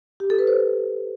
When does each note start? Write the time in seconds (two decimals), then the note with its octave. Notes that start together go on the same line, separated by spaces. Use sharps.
0.20 G4
0.30 A4
0.39 B4
0.47 C5